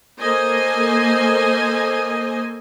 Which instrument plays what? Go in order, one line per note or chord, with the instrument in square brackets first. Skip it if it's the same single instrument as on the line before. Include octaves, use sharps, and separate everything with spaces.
[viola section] A#3 A4 C5 D#5 G#5